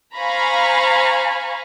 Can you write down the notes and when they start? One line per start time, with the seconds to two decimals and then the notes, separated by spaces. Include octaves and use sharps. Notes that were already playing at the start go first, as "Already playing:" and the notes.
0.17 C5 F5 G#5 A#5 B5 C#6